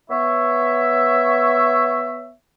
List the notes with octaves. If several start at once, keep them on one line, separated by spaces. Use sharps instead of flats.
B3 C#5 E5